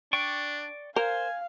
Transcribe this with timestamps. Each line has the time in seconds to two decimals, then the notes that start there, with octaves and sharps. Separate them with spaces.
0.13 D4 D5 G5 C#6
0.96 A#4 C5 F5 G#5